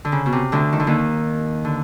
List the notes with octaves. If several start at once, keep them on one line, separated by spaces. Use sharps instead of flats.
D3
C#3
B2
C3
D2 D3
D#3
D3
D#2 D#3
D3